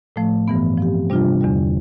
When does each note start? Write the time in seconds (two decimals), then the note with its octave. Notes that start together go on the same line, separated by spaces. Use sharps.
0.16 A2 F3 A3
0.48 G2 E3 B3
0.78 F3 C4 G4
1.10 C3 G3 D4 F4
1.41 E2 D3 G3